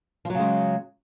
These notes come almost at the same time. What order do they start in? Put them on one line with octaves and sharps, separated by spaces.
F3 F#3 C#3 G#3